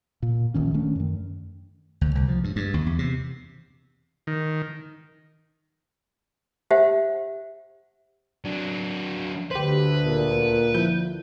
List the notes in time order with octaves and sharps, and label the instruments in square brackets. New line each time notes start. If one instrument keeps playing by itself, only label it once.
[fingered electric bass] A#2
D#1 A#1 D#3 C#4
D#3 A3 C#4 D4
F#2 D#3
[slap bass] D2
C2
F3
G2
G2
D#2
E2
C3
[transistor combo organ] D#3
[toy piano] G4 C5 E5 F#5
[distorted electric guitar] F#3 D4
[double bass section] D2 D3 [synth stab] G4 C5 [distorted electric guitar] B4
[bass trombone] A#2
[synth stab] F3 E4 G6